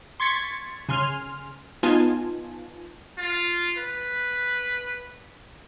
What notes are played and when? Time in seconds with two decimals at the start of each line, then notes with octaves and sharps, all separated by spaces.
0.20 C6 C#6 G#6 A6 B6 C#7
0.89 C#3 G#5 C6 F6
1.83 B3 D#4 F4 G#5 A5
3.18 F4
3.78 B4